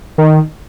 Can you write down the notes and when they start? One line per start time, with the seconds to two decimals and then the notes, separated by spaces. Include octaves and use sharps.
0.18 D#3